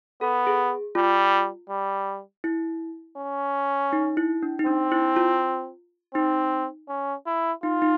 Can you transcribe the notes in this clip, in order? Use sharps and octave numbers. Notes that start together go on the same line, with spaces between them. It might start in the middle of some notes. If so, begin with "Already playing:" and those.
B3 A4
G#4
G3 F4
G3
E4
C#4
D#4
E4
D4
D#4
C4 D4
E4
F4
C4 D#4
C#4
E4
D#4 F4
D#4